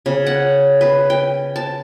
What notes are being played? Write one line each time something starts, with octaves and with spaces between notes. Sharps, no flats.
C#3
F#5
B4
G5
A5